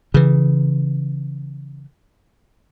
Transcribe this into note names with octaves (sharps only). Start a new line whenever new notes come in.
C#3 E3